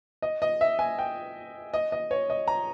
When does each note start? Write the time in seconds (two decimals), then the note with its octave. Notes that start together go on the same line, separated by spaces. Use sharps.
0.22 D#5
0.42 D#5
0.61 E5
0.79 G#5
0.99 G5
1.74 D#5
1.92 D#5
2.11 C#5
2.30 D#5
2.48 A#5